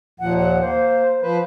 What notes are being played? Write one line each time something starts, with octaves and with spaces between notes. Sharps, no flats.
D#2 A#2 F3 F#5
F#5
A#3 C5
F3 B4 C5